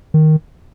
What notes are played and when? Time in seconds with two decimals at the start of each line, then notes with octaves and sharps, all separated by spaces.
0.14 D#3